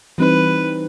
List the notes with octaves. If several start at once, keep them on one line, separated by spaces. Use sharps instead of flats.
E3 G3 C4 D#4 B4